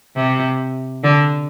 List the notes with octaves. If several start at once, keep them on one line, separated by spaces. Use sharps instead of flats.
C3
D3